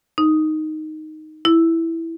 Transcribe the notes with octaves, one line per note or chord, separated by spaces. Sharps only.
D#4
E4